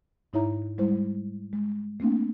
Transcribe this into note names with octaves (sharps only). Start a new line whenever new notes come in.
G#2 D#4 E4 C#5 E5 A#5
G3 G#3 E4 C5
G#3
A3 A#3 C4 D4